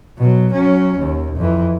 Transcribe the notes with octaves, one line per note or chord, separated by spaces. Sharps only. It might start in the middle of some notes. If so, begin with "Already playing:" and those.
B2 F#3
F#3 C#4
D#2
F2 E3